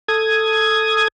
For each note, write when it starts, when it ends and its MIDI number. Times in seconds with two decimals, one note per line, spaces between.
0.08 1.08 69
0.08 1.08 87
0.08 1.08 92